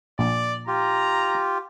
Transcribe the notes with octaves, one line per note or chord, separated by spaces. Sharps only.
A#1 D5
F4 G4 A#5